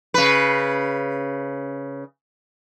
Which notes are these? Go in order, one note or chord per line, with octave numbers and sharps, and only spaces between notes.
C#3 B4